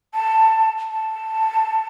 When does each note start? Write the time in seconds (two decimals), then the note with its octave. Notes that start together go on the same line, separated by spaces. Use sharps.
0.14 A5
0.91 A5